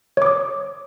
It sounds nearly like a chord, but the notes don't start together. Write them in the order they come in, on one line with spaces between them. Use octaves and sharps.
C#5 D6 D#6